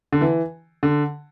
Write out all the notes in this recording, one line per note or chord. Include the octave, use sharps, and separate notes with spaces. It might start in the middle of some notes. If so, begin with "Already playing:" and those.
D3
E3
D3